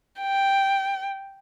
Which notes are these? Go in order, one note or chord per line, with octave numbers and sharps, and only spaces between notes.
G5